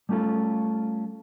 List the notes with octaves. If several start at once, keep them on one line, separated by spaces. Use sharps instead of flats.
G3 A3 C#4 F4 A4